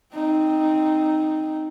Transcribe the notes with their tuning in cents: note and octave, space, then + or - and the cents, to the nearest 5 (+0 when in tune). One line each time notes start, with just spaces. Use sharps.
C4 +0 D#4 +0